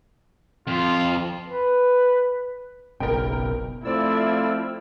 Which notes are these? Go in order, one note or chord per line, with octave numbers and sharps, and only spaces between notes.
F2 F4
B4
F#1 B1 B2 A#4 G5
F3 A3 C4 E4 F4 D5 E6